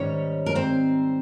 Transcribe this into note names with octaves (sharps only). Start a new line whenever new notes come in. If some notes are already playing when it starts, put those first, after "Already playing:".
Already playing: G#2 D#3 G3 C#4 C#5
A#4
C4 C5